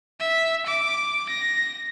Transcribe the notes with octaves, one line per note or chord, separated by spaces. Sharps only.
E5
D6
A#6